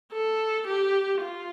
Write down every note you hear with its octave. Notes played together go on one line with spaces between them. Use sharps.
A4
G4
F4